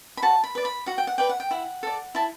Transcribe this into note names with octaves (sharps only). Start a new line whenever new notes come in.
B5
F#4 A5
B5
B4 D5
B5
F#4 F#5
G5
F#5
B4 D5 G5
F#5
G5
E4 F#5
A4 D5
E4 A5